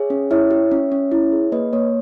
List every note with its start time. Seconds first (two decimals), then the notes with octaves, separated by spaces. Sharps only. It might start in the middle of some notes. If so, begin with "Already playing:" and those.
Already playing: G#4 C#5 E5
0.10 C#4
0.31 E4 C#5 E5
0.51 G4
0.71 C#4
0.92 C#4
1.12 E4
1.32 G#4
1.52 A#3 B4 D#5
1.73 A#3 C#5